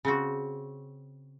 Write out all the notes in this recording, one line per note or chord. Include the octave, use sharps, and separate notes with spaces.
C#3 C4 F#4